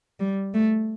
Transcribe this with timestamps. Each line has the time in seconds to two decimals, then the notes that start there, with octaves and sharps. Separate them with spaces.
0.20 G3
0.54 A3